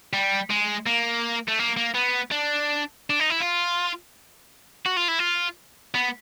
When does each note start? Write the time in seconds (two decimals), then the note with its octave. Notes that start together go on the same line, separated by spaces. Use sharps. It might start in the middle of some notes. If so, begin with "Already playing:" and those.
0.13 G3
0.50 G#3
0.86 A#3
1.48 A3
1.59 A#3
1.77 A#3
1.95 B3
2.31 D4
3.10 D4
3.20 D#4
3.30 E4
3.40 F4
4.86 F#4
4.97 F4
5.08 E4
5.19 F4
5.95 B3